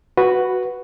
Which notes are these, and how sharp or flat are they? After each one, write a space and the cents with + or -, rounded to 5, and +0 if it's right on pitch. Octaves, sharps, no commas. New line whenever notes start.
F#4 +0 B4 +0